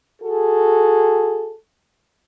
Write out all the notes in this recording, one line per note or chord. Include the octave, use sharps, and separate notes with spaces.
F#4 G#4 A4